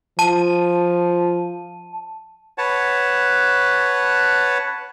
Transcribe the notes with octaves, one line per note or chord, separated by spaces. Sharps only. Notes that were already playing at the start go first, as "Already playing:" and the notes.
F3 A5 D#7
B4 C#5 F#5 A5